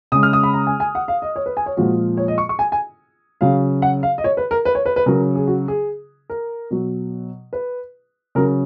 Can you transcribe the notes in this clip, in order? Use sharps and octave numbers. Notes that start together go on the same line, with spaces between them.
C#3 G#3 D#6
F6
D#6
B5
A#5
G#5
G#5
F#5
F5
D#5
C#5
B4
G#5
C#5
A#2 F3 G#3 F#4
C#5
D#5
C#6
C#6
G#5
G#5
C#3 F#3 F5
F#5
F5
D#5
C#5
B4
A#4
B4
C#5
B4
B4
C#3 F#3 A#4
G#4
F#4
G#4
A#4
B2 F#3
B4
C#3 F#3 A#4